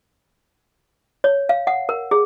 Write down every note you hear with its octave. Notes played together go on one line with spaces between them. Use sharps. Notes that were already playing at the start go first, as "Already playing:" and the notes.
C#5
F5
F#5
A#4
G#4